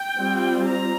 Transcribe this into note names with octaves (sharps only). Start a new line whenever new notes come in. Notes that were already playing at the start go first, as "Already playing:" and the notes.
Already playing: G5
G3 C4 F4
A#5